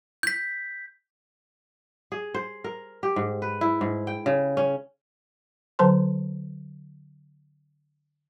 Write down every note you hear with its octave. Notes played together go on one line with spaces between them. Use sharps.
G6 B6
G#4
C5
A#4
G4
G#2
B4
E4
G#2
G5
C#3
C#4
D3 F#3 B4 C5 A5 C6